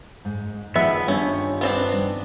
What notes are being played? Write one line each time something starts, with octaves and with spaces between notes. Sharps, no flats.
G#2
D#3 F3 B3 G#4 E5
G2 C#4
B3 C4 D4